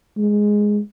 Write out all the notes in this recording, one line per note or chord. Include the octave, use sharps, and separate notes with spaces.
G#3